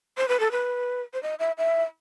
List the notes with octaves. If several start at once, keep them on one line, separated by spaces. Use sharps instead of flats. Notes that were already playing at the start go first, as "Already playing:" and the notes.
C5
B4
A4
B4
C5
D#5
E5
E5